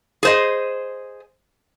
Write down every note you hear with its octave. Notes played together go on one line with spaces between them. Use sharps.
G#4 C5 D#5